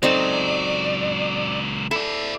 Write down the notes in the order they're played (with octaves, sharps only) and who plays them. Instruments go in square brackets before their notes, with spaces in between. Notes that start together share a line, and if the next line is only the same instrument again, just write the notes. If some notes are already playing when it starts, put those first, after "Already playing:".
[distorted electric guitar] C#2 F#3 [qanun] C4 D#4 A4 [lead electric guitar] D5
[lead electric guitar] E4 D5 [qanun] A4